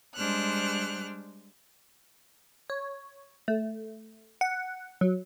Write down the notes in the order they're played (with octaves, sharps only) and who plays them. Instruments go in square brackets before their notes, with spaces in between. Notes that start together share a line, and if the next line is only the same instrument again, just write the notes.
[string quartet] G3 G#3 D4 C5 F6 F#6
[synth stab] C#5
A3
F#5
F#3